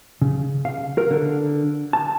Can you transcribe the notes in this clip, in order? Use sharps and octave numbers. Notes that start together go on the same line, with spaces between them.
C#3
F5
A#4
D3
A5